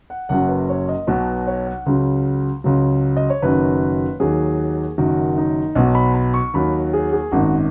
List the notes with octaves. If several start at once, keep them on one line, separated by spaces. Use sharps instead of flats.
F#5
F#1 F#2 F#3 F#5
B4
C#5
D#5
B1 B2 F#3 B4
C#5
F#5
C#2 C#3 F#3
C#2 C#3 F#3
D#5
C#5
F#1 F#2 D#3 F#3 B4
D#2 D#3 F#3 G#4
F#1 F#2 D#3 F#3 F#4
D#4
B1 B2 F#3 D#5
B5
B5
C#6
D#2 D#3 F#3 B5
G#4
G#4
G#1 F#2 D#3 F#4